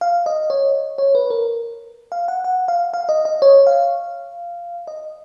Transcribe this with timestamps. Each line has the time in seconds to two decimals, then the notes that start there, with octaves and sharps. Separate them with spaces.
0.01 F5
0.26 D#5
0.50 C#5
0.98 C#5
1.15 B4
1.30 A#4
2.12 F5
2.28 F#5
2.44 F#5
2.68 F5
2.94 F5
3.09 D#5
3.25 D#5
3.42 C#5
3.67 F5
4.87 D#5